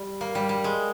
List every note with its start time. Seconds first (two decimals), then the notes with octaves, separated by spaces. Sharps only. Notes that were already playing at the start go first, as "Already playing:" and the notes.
Already playing: G3
0.21 A#3
0.35 G3
0.49 G3
0.64 G#3